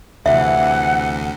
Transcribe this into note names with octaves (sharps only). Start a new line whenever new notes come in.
D2 C3 E3 E5 F#5